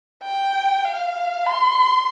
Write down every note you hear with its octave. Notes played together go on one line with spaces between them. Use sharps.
G5
F5
C6